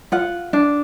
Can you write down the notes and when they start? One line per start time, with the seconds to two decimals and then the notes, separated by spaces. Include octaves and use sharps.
0.12 F4 F#5
0.53 D4